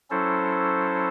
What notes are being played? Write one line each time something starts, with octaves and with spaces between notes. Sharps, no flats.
F#3 C#4 E4 A4 C5